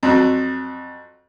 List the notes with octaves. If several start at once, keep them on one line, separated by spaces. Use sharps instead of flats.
F2 F#3